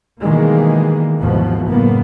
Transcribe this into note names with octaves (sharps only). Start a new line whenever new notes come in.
B2 D#3 E3 G3 G#3 A#3
G#1 D#2 B2 E3 F3
F#1 F#2 A2 A#3 B3